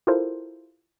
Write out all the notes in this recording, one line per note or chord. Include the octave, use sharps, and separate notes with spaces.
E4 F4 G4 A4 A#4 C5